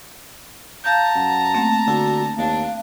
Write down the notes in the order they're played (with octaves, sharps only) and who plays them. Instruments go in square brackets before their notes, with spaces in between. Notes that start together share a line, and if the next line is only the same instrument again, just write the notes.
[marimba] F5 G6 [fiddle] A5 A#5
[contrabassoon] F#2 [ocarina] F#5
[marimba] A3 A#3 C4
[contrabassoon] D3 [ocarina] F#4
[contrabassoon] D#2 [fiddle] D4 [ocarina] F5